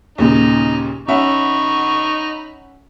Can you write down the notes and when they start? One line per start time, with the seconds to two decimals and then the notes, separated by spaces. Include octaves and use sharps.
0.18 D#2 A#2 C#3 D#4
1.08 C#4 D#4 E5 F#5 B5 C#6